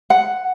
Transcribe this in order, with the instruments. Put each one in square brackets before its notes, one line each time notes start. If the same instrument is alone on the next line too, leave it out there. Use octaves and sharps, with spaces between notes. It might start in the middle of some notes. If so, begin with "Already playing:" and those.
[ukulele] F#5